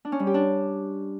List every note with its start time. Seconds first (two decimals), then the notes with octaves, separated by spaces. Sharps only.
0.05 D4
0.12 C#4
0.19 G3
0.27 G4
0.34 D4